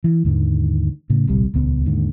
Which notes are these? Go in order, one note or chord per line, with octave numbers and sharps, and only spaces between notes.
E3
D#2 G#2 D3 D#3
A2 C#3
D1 A#1 C3 G3
D#1 C#2 B3
D#2 G#2 D3